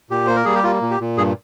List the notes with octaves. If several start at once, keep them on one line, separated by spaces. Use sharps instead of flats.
A#2 G4
A#3 C5
A#4
G3 G#4
G4
A#3 F4
A#2
G4
A#2
G2 G#4